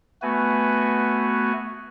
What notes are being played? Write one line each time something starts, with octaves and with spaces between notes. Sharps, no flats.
A3 B3 F#4 B4 G#5